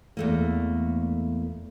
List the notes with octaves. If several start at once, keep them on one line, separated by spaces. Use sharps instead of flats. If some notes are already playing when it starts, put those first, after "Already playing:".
E2 A3 A#3